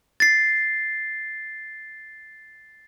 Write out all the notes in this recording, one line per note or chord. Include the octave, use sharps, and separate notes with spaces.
A6 C7